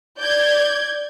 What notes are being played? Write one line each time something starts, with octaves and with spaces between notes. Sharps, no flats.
D5 G6 G#6